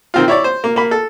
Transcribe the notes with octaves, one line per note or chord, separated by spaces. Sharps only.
D#3 C4 F4
E4 C#5 D5
C5
A#3
A#3 B5
A4